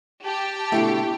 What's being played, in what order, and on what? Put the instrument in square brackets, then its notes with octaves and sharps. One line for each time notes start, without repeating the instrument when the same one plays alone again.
[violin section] G4 [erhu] A5
[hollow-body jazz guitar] B2 D3 A3 [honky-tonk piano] E4